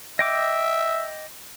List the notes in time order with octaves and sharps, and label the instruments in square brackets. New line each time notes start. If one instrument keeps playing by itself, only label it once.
[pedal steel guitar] D#5 G5 D6 [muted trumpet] E5